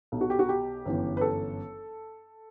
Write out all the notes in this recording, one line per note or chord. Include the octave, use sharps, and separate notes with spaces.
B1 B2
F#4
G4
F#4
G4
G1 F#2 E3
B4
A4